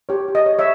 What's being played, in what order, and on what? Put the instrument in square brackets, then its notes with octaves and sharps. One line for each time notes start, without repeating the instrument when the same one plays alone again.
[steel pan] G4 C#5
G4
D#5
C#5
C#5 E5